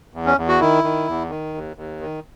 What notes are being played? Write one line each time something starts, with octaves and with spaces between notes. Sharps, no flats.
E2
C#4
E2
F#4
D#3 E4
D#3
E2
D#3
D#2
D#2
D#3